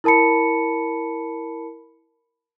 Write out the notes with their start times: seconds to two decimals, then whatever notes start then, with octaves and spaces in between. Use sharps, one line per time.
0.04 E4 A#4 A5 B5 C#7